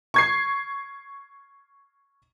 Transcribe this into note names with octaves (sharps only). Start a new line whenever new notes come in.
C#6 G#6 C7